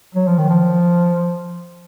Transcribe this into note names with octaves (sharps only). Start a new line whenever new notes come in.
F#3
F3
D#3
F3